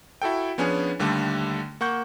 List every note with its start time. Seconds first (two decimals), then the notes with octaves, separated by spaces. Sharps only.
0.22 E4 F#4 A4 G5
0.58 F3 B3 C#4 D4 G#4
0.99 D#2 D3 G3 A3
1.81 A#3 F#5 C#6 G6